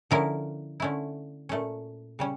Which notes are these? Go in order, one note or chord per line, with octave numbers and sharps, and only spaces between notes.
D3 F3 C#4 E4 A#4
D3 A3 C#4 E4
A#2 A3 C#4
C#3 G3 C#4